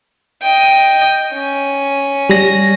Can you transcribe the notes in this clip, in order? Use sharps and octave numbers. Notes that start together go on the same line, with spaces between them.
D#5 G5
C#4
G3 A#6